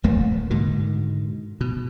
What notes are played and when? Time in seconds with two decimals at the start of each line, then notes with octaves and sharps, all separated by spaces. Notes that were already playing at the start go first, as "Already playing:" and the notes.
0.03 D#1 D#2 A3 A#3
0.50 G#2 B2 D3 D#3
1.61 B2